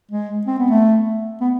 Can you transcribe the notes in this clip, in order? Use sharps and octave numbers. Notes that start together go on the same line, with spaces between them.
G#3
C4
B3
A3
B3